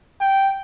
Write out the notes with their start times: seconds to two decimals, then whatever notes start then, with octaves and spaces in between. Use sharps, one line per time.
0.21 G5